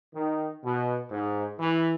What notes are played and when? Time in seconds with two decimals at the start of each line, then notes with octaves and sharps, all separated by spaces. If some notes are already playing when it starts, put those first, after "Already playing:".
0.15 D#3
0.63 B2
1.11 G#2
1.59 E3